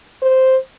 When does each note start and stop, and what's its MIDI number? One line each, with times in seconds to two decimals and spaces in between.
0.22 0.57 72